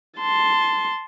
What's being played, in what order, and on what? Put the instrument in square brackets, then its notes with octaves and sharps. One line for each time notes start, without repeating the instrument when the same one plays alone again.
[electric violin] A5 C6